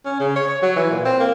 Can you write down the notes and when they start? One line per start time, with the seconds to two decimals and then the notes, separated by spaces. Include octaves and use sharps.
0.05 C#4
0.20 C#3
0.36 C#5
0.48 C#5
0.62 F#3
0.76 E3
0.91 A#2
1.05 C4
1.20 A#3